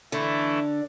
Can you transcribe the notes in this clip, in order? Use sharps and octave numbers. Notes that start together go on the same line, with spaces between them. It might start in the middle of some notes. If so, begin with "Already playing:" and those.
D3 E3 A3 D4 E4